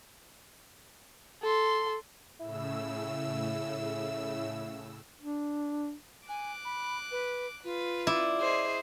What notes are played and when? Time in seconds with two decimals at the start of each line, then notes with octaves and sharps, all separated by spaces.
1.42 A4 C6
2.40 A2 C#3 E4 E6
5.20 D4
6.29 G#5 D6 F#6
6.65 B5
7.11 B4
7.64 F4 B4
8.07 E4 D5
8.39 G#4 C5 D#5